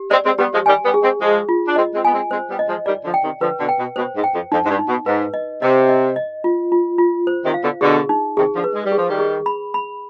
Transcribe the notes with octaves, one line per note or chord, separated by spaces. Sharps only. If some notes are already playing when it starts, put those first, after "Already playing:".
Already playing: G4
G#3 C4 D5
G#3 C4
G3 B3 G4
F3 G#3
D#3 G3 G#5
G3 B3
G#4
G#3 C4
F3 G#3 G#4
F4
D4
G#3 C4 D#5
G#3 C4
B3 G#5
G#3 C4
G#3 C4 C5
G3 B3
D#5
F3 G#3
D#3 G3 D5
D3 F3
G5
C3 D#3
D3 F3 B4
B2 D3
G5
B2
B2 C5
G#2
G5
F2
F2 D#4
G#2
G2
D#4
B2
G#2 B4
D#5
C3 D#5
D#5
D#5
F4
F4
F4
C5
C3 D#3
F5
B2 D3
B2 D3 G#4
D#4
C3 D#3 G#4
D3 F3
B4
G#3
G3
G#4
F3
D#3 G3
G#4
B5
B5